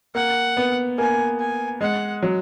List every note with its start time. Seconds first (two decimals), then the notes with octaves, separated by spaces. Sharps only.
0.15 A#3 F#5
0.57 B3
0.98 A#3 G#5
1.40 G#5
1.81 G#3 F#5
2.23 F#3